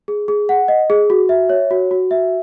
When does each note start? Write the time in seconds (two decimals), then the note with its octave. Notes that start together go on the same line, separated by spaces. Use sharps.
0.08 G#4
0.28 G#4
0.49 F#5
0.68 D#5
0.90 G#4
1.10 F#4
1.29 E5
1.49 C#5
1.71 F#4
1.91 F#4
2.11 E5